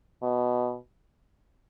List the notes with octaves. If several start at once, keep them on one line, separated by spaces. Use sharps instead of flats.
B2